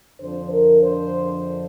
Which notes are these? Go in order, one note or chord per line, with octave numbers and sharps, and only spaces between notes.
F2 D3 F3 D4 C5
A#4
C5